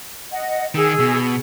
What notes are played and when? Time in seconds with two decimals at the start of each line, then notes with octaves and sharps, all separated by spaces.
0.31 D#5 F#5
0.75 D#3 G#4 E6
1.00 B2